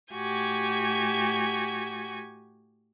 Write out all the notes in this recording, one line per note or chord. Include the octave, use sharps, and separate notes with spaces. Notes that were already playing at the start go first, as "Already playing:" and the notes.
A2 F#4 G4 G#5 G#6